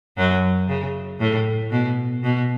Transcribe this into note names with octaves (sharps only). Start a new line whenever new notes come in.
F#2 F#3
C#3
A2
B2
B2